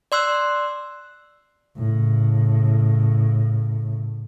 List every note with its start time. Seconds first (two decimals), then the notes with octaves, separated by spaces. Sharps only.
0.12 D5 C6 E6 F#6
1.77 A2 C#3